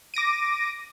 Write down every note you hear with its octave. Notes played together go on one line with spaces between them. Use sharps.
D6 A#6 D7 D#7